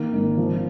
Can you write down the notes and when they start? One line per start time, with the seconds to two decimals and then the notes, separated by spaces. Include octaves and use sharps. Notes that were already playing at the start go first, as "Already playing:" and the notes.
Already playing: D#3 A#3
0.13 G#1
0.38 F3